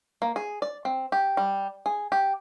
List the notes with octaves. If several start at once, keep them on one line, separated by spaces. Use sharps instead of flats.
A#3
G#4
D5
C4
G4
G3
G#4
G4